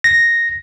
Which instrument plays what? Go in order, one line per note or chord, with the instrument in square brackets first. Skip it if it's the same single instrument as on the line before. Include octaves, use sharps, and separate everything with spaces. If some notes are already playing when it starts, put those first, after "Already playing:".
[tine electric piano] A#6